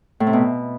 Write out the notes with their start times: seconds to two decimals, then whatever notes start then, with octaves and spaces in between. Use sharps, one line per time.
0.20 A2
0.27 C3
0.33 B2